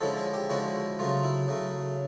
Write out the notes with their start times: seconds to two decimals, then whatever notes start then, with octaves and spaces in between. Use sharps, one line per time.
0.01 D3 F3 G#3 C#4 E4 A4
0.17 G#4
0.34 G4
0.50 D3 F3 G#3 C#4 E4 F#4
0.99 C#3 F#3 A3 F4
1.24 E4
1.48 C#3 F#3 A3